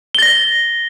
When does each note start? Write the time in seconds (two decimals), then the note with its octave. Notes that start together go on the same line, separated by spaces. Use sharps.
0.15 G7
0.18 A6
0.22 A#6